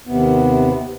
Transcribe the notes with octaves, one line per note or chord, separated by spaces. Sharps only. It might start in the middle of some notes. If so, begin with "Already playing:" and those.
D#2 C3 B3